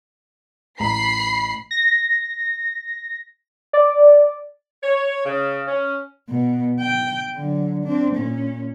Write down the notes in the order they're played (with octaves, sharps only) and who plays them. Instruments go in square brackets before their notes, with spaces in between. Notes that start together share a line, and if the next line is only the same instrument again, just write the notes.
[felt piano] A1 A#5 [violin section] B5 C7
[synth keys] A#6
D5
[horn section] C#5
C#3
C#4
[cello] B2
G5
D3 F#3
C4 D4
A#2 C#4